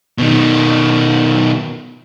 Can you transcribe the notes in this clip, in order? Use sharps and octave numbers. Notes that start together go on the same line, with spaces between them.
B2 D#3